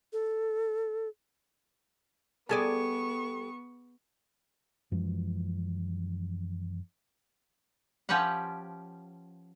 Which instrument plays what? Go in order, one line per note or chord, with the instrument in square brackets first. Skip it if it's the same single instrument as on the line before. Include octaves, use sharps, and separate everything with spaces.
[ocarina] A4
[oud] G3 A4 D5 [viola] B3 C#6 [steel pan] G#4 G#5 A5
[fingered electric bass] F#2 E3 F3 G#3
[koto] F3 C#4 G4 B4 F#5